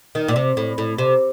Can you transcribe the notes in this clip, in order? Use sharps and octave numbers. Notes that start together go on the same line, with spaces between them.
D#3
A#2
C3
A2
A2
C3